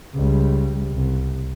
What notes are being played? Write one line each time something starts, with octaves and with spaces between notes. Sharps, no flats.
C#2 G3
C2